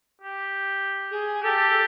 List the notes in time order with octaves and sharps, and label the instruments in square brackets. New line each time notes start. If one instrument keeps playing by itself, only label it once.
[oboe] G4
[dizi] G#4
[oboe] G4 [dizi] A4